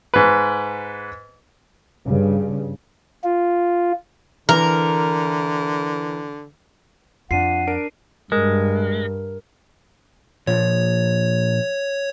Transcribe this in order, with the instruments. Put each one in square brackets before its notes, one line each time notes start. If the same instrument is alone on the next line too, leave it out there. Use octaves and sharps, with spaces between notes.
[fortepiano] G#2 B4
[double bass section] G2 C#3
[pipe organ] F4
[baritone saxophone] D3 [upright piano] E3 [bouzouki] A#4
[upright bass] F2 [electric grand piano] D4 F4 [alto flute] F#5 [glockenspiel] C7 D#7
[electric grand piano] D4 A#4 D7
[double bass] G2 [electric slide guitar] G#3 [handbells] A#4
[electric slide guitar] A#2 F3 [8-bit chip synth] C#5